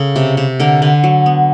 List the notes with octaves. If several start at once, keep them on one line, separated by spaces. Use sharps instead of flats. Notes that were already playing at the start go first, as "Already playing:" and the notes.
Already playing: C#3 A4
C3
C3
D3 A#4
D3 B4
F#3
B3